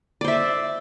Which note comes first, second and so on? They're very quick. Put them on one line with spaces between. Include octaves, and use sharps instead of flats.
D5 C5 E5